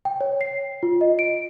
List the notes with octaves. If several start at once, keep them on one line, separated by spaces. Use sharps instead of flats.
G5
C#5
C7
F4
D#5
D7